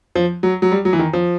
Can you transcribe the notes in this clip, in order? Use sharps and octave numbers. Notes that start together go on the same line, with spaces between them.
F3
F#3
F#3
G3
F#3
E3
D#3
F3